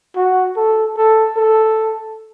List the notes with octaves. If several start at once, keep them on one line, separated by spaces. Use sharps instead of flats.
F#4
A4
A4
A4